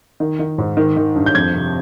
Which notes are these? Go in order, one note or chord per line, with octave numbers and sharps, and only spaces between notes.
D#3
D#3
G#2
D#3
D#3
G2
G6
F2 G#6
C3